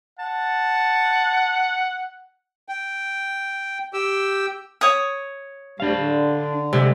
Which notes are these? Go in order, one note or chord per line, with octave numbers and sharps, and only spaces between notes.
F#5 A5
G5
G4 G5 E6
C#5 D#6
D2 G3 D4 F5
D3
C3 G3 G#3